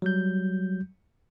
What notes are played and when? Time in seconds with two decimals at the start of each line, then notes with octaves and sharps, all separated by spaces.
0.02 F#3 G3 G6